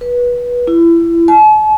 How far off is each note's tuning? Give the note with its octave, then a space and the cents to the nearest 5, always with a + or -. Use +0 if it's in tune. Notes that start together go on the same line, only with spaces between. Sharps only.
B4 -20
E4 +30
A5 -45